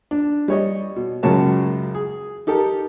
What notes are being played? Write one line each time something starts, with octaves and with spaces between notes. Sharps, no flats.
D4
G3 C#5 D#5
B2
C#2 F#2 C#3 A#4 C#5 A5
G#4
D#4 G4 A4 A#4